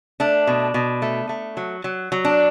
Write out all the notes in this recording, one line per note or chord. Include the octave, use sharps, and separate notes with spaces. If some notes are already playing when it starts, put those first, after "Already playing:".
A3 D4
B2
B2
A3
A3
F#3
F#3
F#3
D4